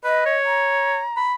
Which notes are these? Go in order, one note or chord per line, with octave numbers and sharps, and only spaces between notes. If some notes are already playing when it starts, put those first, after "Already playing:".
B4 D#5
C#5
A#5
B5